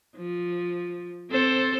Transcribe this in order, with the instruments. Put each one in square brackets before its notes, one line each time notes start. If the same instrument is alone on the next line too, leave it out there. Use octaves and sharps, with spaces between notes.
[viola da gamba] F3
C4 A4 C5